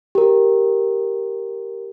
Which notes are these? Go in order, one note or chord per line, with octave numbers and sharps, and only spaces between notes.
G4 A#4